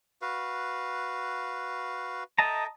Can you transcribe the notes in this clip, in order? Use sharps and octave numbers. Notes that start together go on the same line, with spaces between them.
F#4 B4 F5
A4 D#5 E5 G5 A5 A#5